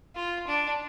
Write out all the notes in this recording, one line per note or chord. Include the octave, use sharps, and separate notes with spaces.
F4
D4